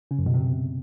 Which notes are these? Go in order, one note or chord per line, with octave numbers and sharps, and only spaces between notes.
C#3
F#2
B2
C3